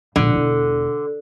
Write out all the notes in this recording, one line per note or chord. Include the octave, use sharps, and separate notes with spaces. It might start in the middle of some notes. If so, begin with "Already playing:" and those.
E1 A#1 D3
E1 E4